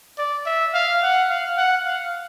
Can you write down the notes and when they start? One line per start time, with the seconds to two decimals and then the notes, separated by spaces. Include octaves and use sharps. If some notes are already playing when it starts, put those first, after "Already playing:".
0.18 D5
0.46 E5
0.74 F5
1.03 F#5
1.30 F5
1.58 F#5
1.86 F5